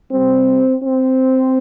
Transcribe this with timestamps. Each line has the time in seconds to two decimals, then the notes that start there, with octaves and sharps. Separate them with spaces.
0.12 C3 G3 C4
0.83 C4